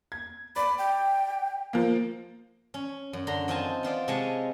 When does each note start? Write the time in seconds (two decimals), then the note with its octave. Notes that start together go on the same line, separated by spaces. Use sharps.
0.12 G#6
0.56 D5 B5
0.78 G5
1.73 F3 A#3
2.74 C#4
3.13 F#2
3.27 D3 A#5 C6
3.48 C4 D#4 F4 C5 G#5 A5
3.83 B3 F4 C5 D5
4.08 C3 G#3 G#4 C#5 G#5 A5